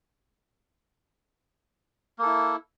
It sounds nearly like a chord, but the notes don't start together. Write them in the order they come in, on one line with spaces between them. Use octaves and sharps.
A#3 A4 E4